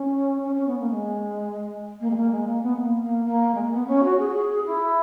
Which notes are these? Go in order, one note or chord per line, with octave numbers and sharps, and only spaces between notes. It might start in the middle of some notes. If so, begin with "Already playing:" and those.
Already playing: C#4
C#4
C#4
B3
A#3
G#3
A#3
G#3
A#3
G#3
A#3
B3
A#3
A#3
A#3
G#3
A#3
B3
C#4
F#4
G#4
F#4
G#4
G#4
E4